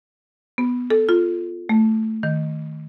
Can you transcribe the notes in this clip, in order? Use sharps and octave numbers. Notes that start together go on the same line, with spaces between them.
B3
A4
F4
A3
D#3